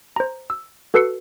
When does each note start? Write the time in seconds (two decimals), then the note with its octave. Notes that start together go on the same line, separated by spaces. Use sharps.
0.16 C5 A#5
0.50 E6
0.94 F#4 A4 B4 E6 C7 C#7